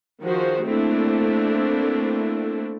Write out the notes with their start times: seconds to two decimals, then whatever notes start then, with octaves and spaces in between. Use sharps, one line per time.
0.22 D#3 F3 F#4 G#4 C5
0.64 A3 A#3 C4 D4 E4 A4